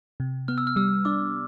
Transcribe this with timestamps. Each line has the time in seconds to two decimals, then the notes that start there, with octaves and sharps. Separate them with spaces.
0.20 C3
0.48 B3 F6
0.58 E6
0.67 F6
0.76 G3 E6
1.05 D4 D6